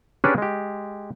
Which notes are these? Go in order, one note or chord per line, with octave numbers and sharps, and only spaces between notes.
C#4 D4 G4 G#4 B4 D5
G#3 G4